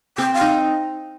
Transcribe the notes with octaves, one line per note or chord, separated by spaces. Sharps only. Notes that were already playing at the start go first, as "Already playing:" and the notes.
C4 G5
F5
D#4